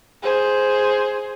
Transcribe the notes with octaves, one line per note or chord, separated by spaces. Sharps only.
G#4 C5